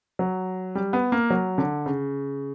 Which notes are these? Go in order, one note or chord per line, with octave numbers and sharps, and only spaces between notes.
F#3
G3
B3
A#3
F#3
D3
C#3